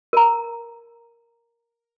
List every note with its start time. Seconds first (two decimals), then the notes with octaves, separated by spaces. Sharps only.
0.13 A#4 A#5